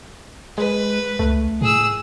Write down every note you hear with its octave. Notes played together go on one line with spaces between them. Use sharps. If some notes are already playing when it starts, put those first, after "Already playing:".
G#3 B4
C#2 A3
A2 G#4 E6